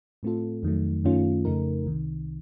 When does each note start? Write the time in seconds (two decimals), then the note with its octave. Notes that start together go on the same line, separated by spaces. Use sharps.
0.23 A2 A3 C4 F4 A4
0.63 F2 D#3 F#3 A3
1.04 F#2 D#3 A3 C#4 F4
1.45 F2 C#3 A3 D#4 A#4
1.86 C2 C3 D#3